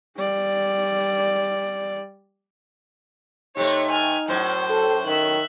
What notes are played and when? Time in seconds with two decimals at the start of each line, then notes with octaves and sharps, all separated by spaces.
0.17 G3 D5
3.57 C3 A3 D#4 C#5
3.91 G#5 F6
4.28 F#2 A2 C5
4.69 A4
5.06 D#3 E5 F#6